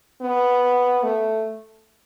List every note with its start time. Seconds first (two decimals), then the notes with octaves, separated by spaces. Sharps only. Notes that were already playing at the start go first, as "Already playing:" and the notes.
0.21 B3
1.03 A3